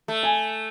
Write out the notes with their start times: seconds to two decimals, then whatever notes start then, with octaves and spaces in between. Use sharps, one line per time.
0.08 A3
0.23 G#5